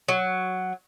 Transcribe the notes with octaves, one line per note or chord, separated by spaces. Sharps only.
F#3